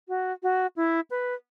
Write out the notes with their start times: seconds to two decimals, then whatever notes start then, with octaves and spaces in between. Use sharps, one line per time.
0.09 F#4
0.43 F#4
0.76 E4
1.10 B4